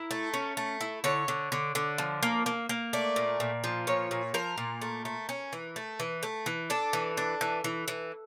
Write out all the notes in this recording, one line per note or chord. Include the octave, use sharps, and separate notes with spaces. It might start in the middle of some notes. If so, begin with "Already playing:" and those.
Already playing: E4 A#4
A3
C#4
A3
E4
D3 C#5
D3
D3
D3
F3
A#3
A#3
A#3
A3 D5
A#2
A#2
F3
A#2 C#5
A#2
F3 A#4
A#2
A3
A3
C#4
E3
A3
E3
A3
E3
D4 A4
E3
D4
E3
E3
E3